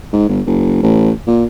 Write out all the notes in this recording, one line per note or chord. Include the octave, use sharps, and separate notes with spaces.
G#2
G1
F#1
A1
A#2